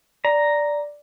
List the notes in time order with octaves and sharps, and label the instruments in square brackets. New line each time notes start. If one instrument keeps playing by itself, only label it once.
[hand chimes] D5 [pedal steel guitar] A#5